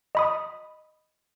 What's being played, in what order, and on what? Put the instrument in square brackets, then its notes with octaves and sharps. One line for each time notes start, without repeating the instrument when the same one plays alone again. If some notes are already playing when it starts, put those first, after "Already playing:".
[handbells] D#5 B5 D#6